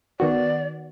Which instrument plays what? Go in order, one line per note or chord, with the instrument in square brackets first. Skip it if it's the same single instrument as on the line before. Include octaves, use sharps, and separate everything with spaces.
[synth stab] D#3 B3 F#4 [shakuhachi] D5